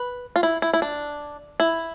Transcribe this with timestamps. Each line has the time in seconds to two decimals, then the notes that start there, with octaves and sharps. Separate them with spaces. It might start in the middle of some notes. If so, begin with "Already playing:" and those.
Already playing: B4
0.36 F4
0.43 E4
0.62 E4
0.74 E4
0.82 D4
1.60 E4